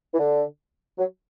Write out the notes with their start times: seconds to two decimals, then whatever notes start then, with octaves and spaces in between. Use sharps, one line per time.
0.14 E3
0.19 D3
0.98 F#3